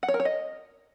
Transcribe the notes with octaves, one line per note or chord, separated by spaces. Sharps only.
F#5
C#5
A#4
C#5
D#5